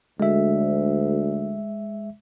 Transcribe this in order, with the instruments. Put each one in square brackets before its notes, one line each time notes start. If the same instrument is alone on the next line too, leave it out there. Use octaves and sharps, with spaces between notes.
[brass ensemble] D2 [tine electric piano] G#3 E5